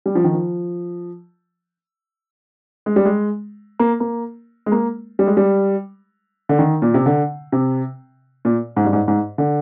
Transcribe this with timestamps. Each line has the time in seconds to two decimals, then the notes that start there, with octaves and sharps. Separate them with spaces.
0.06 G3
0.15 F3
0.24 D#3
0.33 F3
2.86 G#3
2.96 G3
3.05 G#3
3.79 A#3
4.00 A#3
4.66 G#3
4.72 A#3
5.19 G3
5.27 G#3
5.37 G3
6.49 D3
6.59 D#3
6.82 A#2
6.94 C3
7.06 D3
7.52 C3
8.45 A#2
8.76 G#2
8.85 G2
8.93 G#2
9.08 G#2
9.38 D3